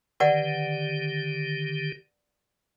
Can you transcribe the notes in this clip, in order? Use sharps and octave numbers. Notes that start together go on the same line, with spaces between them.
D3 D#3 G4 B4 D5 F#5